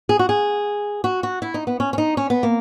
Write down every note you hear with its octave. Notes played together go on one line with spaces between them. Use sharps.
G#4
F#4
G#4
F#4
F#4
E4
D#4
B3
C#4
C#4
D#4
C#4
B3
A#3